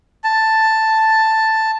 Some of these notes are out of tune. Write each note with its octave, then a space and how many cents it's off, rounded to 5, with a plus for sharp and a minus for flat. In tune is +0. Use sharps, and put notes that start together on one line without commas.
A5 +5